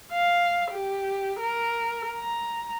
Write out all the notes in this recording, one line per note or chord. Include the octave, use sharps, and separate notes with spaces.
F5
G4
A#4
A#5